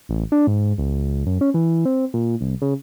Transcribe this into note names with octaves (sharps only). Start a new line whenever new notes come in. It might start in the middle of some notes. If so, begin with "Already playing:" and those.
A1
D4
G#2
C#2
F#2
C#4
E3
C4
A#2
C2
C#3